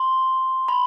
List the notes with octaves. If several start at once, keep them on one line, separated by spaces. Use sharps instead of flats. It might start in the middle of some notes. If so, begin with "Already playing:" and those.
Already playing: C6
B5